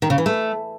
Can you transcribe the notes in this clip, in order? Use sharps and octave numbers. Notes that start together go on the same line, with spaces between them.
D#3
C#3
E3
A3